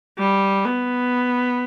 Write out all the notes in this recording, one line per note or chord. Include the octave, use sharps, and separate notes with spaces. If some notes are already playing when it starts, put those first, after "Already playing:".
G3
B3